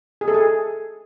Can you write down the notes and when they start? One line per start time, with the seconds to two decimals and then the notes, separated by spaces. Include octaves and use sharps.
0.21 G#4
0.28 A4
0.34 G#4